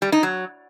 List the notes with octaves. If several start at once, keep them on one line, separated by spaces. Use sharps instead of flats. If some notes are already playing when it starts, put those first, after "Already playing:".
G3
D#4
F#3